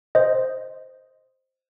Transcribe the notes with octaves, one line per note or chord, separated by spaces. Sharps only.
C5 D#5